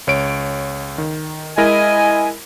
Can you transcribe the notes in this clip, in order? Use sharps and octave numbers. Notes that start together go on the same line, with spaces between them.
C#2 C#5 D7
D#3
G#3 E4 A#4 D#5 G#5